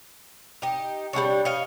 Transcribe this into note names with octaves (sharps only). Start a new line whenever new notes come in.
D#4 G4
G3 C4 D4 C#5
C#5 D#5 F5